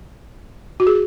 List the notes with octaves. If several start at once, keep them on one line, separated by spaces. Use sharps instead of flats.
F#4
G#4